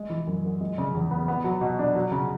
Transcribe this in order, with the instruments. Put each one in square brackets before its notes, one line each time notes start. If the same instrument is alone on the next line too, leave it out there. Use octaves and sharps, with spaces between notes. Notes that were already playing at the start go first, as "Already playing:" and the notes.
Already playing: [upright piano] G#3
E3
F#2
F#2
G#3
C#3
E2
B3
B3
F#3
B2
D4
F#3
C#3